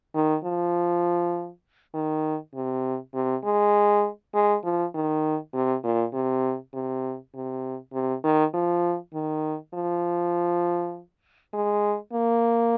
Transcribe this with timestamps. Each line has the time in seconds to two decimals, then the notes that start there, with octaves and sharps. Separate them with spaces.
0.15 D#3
0.44 F3
1.94 D#3
2.55 C3
3.14 C3
3.44 G#3
4.34 G#3
4.64 F3
4.95 D#3
5.54 C3
5.84 A#2
6.13 C3
6.74 C3
7.34 C3
7.94 C3
8.24 D#3
8.54 F3
9.14 D#3
9.74 F3
11.54 G#3
12.14 A#3